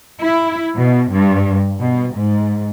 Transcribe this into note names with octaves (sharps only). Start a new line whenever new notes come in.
E4
B2
G2
B2
G#2